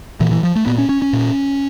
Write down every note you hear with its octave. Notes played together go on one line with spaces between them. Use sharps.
A#2 E3
E3
F3
A3
A#2 B3
C#4
C#4
C#4
A#2